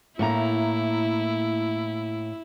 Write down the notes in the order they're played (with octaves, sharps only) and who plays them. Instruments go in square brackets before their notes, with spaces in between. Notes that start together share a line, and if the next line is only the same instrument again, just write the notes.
[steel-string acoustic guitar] A2 A#3 A#5 [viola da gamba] E4